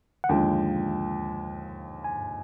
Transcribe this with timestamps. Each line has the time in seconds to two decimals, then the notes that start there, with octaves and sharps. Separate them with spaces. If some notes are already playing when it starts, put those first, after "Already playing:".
0.24 F#5
0.29 D#2 D3 F3 G#3 G5
2.04 G#5